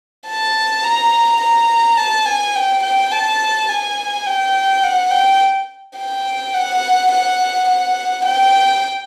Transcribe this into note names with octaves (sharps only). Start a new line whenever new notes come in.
A5
A#5
A#5
A5
G#5
G5
G5
A5
G#5
G5
F#5
G5
G5
F#5
F#5
F#5
G5